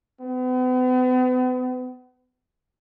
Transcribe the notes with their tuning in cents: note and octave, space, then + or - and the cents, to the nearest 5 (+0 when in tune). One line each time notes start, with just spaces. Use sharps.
B3 +40